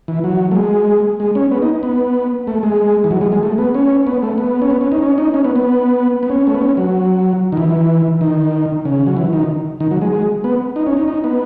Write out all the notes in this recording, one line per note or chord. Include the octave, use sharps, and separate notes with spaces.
E3
F#3
A3
G#3
G#3
C#4
B3
D#4
B3
A3
G#3
E3
F#3
G#3
G#3
A3
B3
C#4
B3
A3
B3
C#4
B3
C#4
D#4
C#4
D#4
C#4
B3
B3
B3
C#4
A3
B3
C#4
F#3
D#3
E3
D#3
C#3
F#3
E3
D#3
D#3
F#3
G#3
G#3
B3
D#4
C#4
D#4
D#4
B3